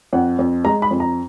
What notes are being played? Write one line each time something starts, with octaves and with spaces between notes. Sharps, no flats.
F2 F#5
F2
G#3 A#5
B5
F2
A#5